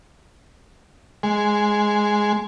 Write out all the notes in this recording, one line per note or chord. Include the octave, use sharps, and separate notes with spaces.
G#3